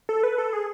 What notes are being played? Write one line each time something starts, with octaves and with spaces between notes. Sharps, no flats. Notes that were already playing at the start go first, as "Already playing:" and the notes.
A4
B4
A4
G#4